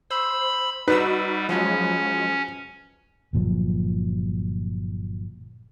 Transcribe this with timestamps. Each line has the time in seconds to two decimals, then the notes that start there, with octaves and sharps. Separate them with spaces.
0.11 C5 B5 E6
0.88 G3 D#4 F#4 B4 E6
1.49 F3 F#3 G#3 C#4
3.33 G1 A#2 F3 F#3